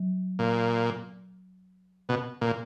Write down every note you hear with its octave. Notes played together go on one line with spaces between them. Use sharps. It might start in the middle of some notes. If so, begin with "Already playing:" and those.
Already playing: F#3
A#2
B2
A#2